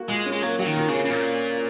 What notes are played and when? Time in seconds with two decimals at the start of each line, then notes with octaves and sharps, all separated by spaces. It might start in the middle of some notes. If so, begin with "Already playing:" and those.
Already playing: A#3 F#4
0.08 A#2 G#3
0.26 C#4
0.32 G#3
0.43 F#3 A#3
0.59 F#3 F#4
0.66 D#3
0.77 A#2
0.88 C#3
0.93 C#4
1.05 C#3
1.10 A#2 A#3